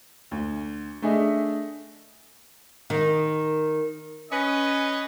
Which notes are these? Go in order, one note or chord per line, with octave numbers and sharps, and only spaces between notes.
D2
A3 D4 G#4 D#5 E5
D#3
C#4 B4 D#5